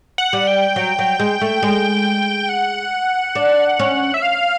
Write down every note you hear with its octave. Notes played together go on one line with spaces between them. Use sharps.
F#5
G3
G5
F#3
F#3
G#3
A3
G#3
F#5
D4
C#4
E5
F5